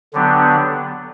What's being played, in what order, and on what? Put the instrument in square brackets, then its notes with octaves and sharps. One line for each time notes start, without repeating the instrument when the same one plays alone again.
[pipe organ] D3 F#3 B3 D4 G4